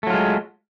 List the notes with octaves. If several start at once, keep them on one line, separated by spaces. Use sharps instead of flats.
F#3 G#3 A3 F4